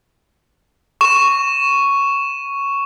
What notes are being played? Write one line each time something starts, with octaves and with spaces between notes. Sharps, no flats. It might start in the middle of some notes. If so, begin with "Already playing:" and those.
C#6 E7